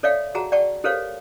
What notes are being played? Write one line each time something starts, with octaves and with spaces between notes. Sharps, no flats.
A4 C#5 D5 E5 F5 G5
F#4 G#4 F#5 A5 A#5
D5 F#5 G5 A5 C#6
G4 A4 A#4 C5 C#5 F5